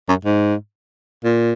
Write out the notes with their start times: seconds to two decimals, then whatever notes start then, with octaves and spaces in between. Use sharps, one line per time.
0.09 F#2
0.25 G#2
1.24 A#2